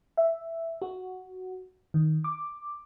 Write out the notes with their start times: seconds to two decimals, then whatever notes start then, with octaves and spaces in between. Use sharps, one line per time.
0.17 E5
0.82 F#4
1.94 D#3
2.24 D6